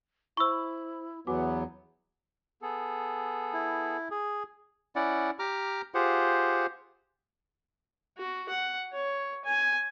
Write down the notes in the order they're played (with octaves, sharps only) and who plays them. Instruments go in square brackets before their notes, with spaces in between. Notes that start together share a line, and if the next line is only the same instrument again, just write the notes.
[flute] E4 [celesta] C5 B5 [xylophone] C#6 E6
[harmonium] E2 F#3 B3 [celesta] F#4 G#5 D6 [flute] F#5
[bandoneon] B3 G#4 A4
[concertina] E4
G#4
[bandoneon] C#4 E4 D5 F#5
G4 A#5 D6 F6
F4 G4 G#4 C5 F#5
[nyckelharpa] F#4
F#5
C#5
G#5